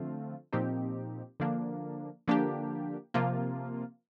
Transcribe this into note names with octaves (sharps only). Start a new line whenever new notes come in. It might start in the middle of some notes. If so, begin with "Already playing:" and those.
Already playing: D3 F3 A3 C4 F4
A#2 F3 C4 D#4 G4
D3 F3 A#3 D4
D3 F3 A#3 D4 G4
C3 F3 A#3 F4